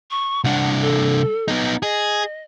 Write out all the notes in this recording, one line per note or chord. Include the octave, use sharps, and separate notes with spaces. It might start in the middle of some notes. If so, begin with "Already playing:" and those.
C#6
C2 D4 F#5
A4
B3 D#4
G#4 D#5